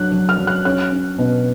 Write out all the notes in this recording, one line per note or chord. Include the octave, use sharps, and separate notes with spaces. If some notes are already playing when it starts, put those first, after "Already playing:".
Already playing: F#3 D4 F#6
F#3
F6
F#3
F#6
C#4 F#6
C#4
B2